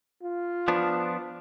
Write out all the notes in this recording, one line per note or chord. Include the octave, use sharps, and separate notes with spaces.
F4
F3 B3 D4